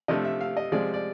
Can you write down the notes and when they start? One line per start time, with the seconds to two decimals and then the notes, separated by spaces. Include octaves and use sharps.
0.08 C3 F3 A3 D4 D#5
0.24 E5
0.41 F5
0.57 D#5
0.72 C3 F3 G#3 D5
0.94 D5